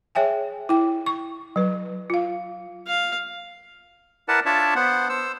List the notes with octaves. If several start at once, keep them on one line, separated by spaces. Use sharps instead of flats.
G#4 C#5 E5 G5 G#5
E4 G5
C#6
F#3 B4
F4 F5
F5
E4 A#4 B4 D5 F#5 A5
D4 F4 C#5 D5 E5 A5
B3 C5 F#5
C5 E6